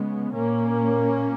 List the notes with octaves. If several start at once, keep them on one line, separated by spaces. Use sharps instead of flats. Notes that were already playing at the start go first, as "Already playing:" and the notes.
Already playing: C#3 G#3 B3
A#2 A#3 C#4